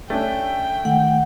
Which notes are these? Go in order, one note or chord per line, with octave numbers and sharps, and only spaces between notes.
A3 C#4 D4 G5
D#3 A3 F#5